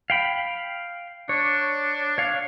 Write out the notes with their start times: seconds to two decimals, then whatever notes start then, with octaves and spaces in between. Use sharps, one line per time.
0.10 F5 G5 B5
1.29 D4 C#5
2.18 C#5 F5